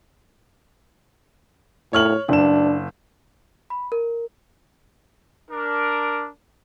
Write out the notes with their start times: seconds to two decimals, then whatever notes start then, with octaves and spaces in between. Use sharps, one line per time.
1.93 A2 C#5 F6 F#7
2.29 F#1 D4 E7
3.70 B5
3.92 A#4
5.51 D4 A#4